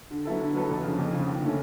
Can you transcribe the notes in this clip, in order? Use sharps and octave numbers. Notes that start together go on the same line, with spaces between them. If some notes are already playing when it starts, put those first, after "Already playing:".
D3
F#3 B3 E4 A4
D3
F#3 B3 E4 A4
F2
C#3 F3
F2
C#3 F3
D#2
D3 F3 A3 C#4